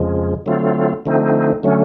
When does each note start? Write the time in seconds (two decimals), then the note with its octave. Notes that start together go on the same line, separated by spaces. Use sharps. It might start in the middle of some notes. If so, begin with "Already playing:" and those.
Already playing: F2 C#3 F3 G#3
0.46 D3 F#3 A3 C4 F4
1.06 D3 F3 A3 C4 D#4
1.63 D3 F#3 A3 C#4